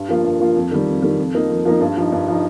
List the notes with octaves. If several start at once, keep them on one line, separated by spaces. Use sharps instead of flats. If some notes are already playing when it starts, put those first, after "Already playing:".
Already playing: G2
F3 A#3 F4
G2
F3 A#3 F4
F2
D#3 G3
F2
D#3 G3
F2
F3 A#3 D#4
F2
F3 A#3 D#4
G2
F3 D#4
G2
F3 D#4